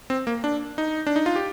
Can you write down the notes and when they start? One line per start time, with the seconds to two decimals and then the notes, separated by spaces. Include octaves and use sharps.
0.10 C4
0.27 A#3
0.44 D4
0.78 D#4
1.07 D4
1.16 D#4
1.26 F4
1.36 G4